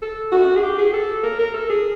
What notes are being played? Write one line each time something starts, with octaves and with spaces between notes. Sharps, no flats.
A4
F#4
G#4
G4
G#4
A4
A#4
A#4
A4
G#4